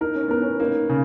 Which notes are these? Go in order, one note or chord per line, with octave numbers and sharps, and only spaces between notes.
D#4 A#4
C#4
B3 A#4
C#4
A#3 D#4
C#3